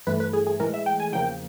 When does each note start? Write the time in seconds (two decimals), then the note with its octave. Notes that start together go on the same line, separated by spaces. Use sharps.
0.07 G2 E3 A3 B4
0.20 B4
0.33 G#4
0.47 G#4
0.60 A2 E3 G#3 A#4
0.74 E5
0.86 G5
1.00 G#5
1.12 E2 C#3 F3 A#3 G5